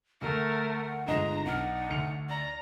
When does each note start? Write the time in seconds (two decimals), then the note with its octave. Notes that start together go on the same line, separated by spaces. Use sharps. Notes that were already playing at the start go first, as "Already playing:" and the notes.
0.22 D2 A3 A#4 F#5
1.07 G1 G#3 D4 D#5 A#5
1.46 B1 D4 D#4 F#5 F6
1.90 D2 C#7 F7
2.29 D5 A#5